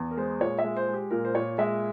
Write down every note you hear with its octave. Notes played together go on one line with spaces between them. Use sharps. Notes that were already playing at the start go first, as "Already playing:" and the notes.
Already playing: E2
A#4
G#3 C5
A#2 C#5
E5
G#3
C5
G#3
G4
A#2 A#4
C5
A#2 C#5
G#3 E5